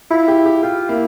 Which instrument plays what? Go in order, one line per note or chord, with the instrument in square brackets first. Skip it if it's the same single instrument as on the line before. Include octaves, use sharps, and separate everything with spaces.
[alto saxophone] E4 [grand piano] F4
[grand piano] G4
G4
[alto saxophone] F4 [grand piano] G4
[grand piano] A#3 [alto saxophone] E4